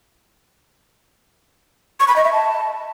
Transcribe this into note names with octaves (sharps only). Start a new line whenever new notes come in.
C#6
B5
D#5
E5
A5